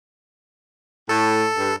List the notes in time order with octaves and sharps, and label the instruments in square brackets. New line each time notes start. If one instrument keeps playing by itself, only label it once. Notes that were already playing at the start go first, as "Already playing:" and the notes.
[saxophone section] A2 [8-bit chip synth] A4
[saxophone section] G2